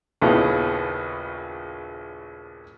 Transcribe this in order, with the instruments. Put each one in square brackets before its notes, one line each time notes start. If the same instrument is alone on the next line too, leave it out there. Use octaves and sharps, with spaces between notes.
[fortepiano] A#1 D#2 C#3 B3 D#4 E4